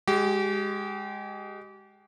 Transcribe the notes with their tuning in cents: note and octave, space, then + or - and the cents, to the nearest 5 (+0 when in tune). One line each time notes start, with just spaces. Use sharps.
G#3 -10 G4 -35